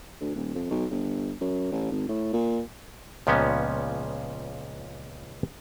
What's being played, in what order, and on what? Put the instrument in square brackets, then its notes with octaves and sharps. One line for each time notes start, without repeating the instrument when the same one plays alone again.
[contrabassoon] D2
D#1
F2
B1
G1
F#2
A1
G#1
A2
A#2
[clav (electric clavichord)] C#2 A#2 F3 B3 C#4